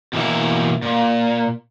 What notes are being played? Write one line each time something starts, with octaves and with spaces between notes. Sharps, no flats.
B2 E3 A#3 E5
A#2